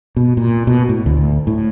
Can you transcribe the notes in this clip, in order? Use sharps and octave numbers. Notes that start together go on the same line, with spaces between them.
B2
A#2
B2
A2
D2
A2